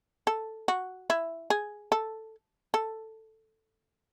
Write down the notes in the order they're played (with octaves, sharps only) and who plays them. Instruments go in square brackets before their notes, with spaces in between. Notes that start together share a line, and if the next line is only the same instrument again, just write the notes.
[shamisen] A4
F#4
E4
G#4
A4
A4